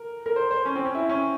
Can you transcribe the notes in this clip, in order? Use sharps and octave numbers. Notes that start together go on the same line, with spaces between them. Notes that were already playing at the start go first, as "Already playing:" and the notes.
Already playing: A#4
A#4
C5
C5
C#4
C4
C#4
E4
C#4